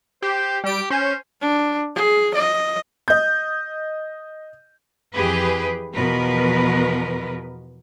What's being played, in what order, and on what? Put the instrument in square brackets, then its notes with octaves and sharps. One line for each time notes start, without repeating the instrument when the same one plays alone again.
[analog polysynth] G4 [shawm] C5
[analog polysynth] G3 D7 [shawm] G4
[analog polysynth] C#4 [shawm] C5
[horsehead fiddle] D4
G#4
D#5
[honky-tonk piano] D#5 G6
[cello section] F2 E3 G4 G#4 B4
E2 B2 F3 A#4 B4